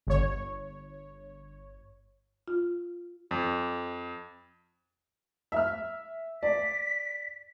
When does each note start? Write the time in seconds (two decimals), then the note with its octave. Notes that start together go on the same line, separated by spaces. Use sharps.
0.07 G1 C#5
2.48 F4
3.31 F2
5.52 E5 F6
6.43 D5 B6